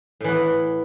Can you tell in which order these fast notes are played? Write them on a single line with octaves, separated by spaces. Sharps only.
A2 E3 B3